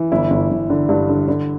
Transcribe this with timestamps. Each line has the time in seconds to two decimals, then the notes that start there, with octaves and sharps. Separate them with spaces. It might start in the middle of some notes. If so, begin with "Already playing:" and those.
Already playing: E3
0.12 G1 E4
0.30 G1
0.50 G1
0.70 D3
0.89 G2
1.09 D3
1.28 D3